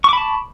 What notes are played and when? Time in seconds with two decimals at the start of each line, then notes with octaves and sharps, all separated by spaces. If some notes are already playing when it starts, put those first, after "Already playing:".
0.04 C#6
0.09 D6
0.13 B5
0.17 A5